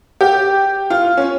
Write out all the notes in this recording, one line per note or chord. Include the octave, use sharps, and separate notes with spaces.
G4
F4
C#4